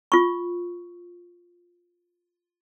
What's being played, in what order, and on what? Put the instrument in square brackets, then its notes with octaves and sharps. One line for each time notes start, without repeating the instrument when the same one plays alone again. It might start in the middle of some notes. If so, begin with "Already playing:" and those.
[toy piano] F4 C#6